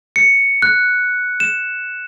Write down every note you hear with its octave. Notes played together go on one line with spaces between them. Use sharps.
C#7
F#6
E7